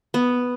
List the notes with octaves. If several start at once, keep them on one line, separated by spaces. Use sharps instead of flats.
B3